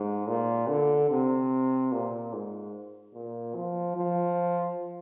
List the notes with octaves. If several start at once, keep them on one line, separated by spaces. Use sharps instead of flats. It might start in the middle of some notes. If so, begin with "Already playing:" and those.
Already playing: G#2
A#2
D3
C3
A#2
G#2
A#2
F3
F3